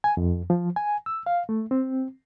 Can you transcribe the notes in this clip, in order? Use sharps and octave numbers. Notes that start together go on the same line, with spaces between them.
G#5
F2
F3
G#5
E6
F5
A3
C4